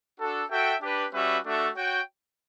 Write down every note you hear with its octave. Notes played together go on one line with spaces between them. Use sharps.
D4 F#4 A4
F#4 A4 E5 G5
D4 G4 B4
G3 C#4 F#4 B4 E5
A3 D4 F#4 A4 E5
F#4 C#5 G5